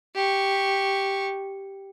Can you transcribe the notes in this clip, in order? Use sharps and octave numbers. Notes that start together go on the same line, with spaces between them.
G4 C#6